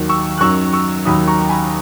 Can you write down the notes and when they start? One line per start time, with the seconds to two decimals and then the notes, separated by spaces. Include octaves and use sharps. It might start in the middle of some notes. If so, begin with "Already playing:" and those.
Already playing: D#2 D#3 F#3
0.09 C#6 E6
0.38 F#6
0.41 F#2 D#3 F#3 C#6 E6
0.73 C#6 E6
1.05 D#2 D#3 F#3 B5 D#6
1.27 A#5 C#6
1.49 G#5 B5